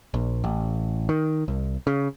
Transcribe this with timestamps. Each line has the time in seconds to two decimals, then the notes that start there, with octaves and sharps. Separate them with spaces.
0.14 A#1
0.44 A1
1.09 D#3
1.48 C2
1.87 C#3